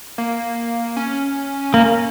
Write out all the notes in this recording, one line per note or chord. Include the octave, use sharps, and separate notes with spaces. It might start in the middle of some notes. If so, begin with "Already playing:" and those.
A#3
C#4
A#3